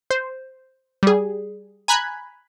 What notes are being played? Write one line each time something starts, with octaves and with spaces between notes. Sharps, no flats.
C5
G3 G#4
G#5 A#5 B5 F#6 G#6